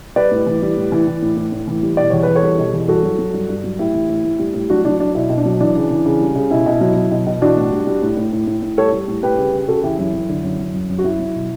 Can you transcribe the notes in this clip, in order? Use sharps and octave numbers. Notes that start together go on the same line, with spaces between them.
G3 B4 D5
A2
E3
G3
A2
E3
E3
A2
A2
A2
E3
G3
B2 D5
E2 C#5
E2 B4
A4 C#5
G3
B2
E2
G2 F#4 A4
F#3
F#3
G2
G2
F#3
A2 E4 G4
E3
A2
A2
G3
A2
F#3 D4 F#4
F#3 D4
F#3 D4
B2 E4
B2
D4
F#3
E3 D4
C#3
E3
C#3
G3
C#3
B2 E4
B2
F#3
F#3
B2
B2
E3 D4 F#4
A2
G3
G3
A2
A2
A2
A2
A2
G3 A4 C#5
G3
A2
G3 G4 B4
C#3
C#3
C#3 F#4 A4
E3 E4 G4
F#2 E4
F#2
D3
F#2
F#2
F#2
F#2
F#4
F#3 E4
F#3
B2